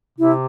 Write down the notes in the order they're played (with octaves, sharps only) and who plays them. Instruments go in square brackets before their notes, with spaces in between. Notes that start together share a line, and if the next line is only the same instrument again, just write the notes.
[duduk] C3 [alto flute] E4